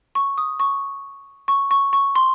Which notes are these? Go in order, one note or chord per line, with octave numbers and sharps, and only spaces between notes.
C#6
D#6
C#6
C#6
C#6
C#6
C6